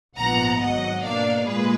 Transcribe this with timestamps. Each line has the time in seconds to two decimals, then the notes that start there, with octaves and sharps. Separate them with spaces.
0.17 A#1 G#2 F3 B3 F#5 A#5
0.60 G#1 G#2 F#3 D#5 F#5
1.03 B2 A#3 D4 D5 F5
1.45 A#2 G#3 G#4 B4